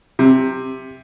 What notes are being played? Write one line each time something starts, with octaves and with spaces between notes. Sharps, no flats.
C3